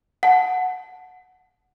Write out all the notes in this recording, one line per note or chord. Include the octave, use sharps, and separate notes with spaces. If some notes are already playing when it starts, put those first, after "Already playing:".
F#5 A5